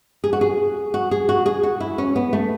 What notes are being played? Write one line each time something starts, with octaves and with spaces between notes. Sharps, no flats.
G#4
F#4
G#4
F#4
G#4
F#4
G#4
F#4
E4
C#4
B3
A3